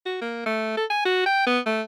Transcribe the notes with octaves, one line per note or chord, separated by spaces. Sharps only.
F#4
A#3
A3
A4
G#5
F#4
G5
B3
A3